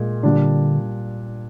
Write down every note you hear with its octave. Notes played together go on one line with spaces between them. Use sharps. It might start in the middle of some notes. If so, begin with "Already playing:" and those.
Already playing: A#2 G#3
A#2 D3 G3 D4